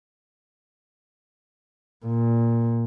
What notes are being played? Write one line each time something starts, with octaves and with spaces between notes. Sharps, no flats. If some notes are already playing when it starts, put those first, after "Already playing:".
A#2